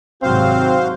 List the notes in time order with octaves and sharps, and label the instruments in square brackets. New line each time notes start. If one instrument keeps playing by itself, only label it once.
[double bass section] G#1 C3 F#3 [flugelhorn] C4 [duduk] F#4 [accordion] C5 F5